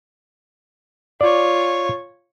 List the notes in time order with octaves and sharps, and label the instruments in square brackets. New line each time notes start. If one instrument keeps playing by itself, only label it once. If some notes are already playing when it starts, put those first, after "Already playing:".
[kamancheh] F4 C#5 [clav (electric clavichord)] D5